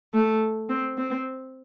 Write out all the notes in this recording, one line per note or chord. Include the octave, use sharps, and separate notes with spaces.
A3
C4
C4